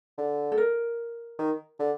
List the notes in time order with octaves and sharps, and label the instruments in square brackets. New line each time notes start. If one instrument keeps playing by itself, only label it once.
[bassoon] D3
[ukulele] A4
A#4
[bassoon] D#3
D3